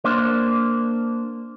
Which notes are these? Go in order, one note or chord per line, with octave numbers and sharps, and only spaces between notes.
A#3 D4 C5